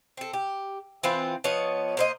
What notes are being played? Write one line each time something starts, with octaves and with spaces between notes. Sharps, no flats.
C4 A4
G4
E3 C4 F4 B4
F3 B3 C#5 D#5
A#3 C5 D#5